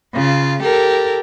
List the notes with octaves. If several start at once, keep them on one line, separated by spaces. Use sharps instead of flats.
C#3 F4
G4 A4 A#4